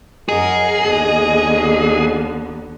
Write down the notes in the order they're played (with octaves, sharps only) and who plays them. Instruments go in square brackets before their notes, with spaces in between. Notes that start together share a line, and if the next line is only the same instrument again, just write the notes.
[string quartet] F#2 A#4 F#5 [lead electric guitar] G#4 [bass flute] D#5
[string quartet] D#2 D3 B3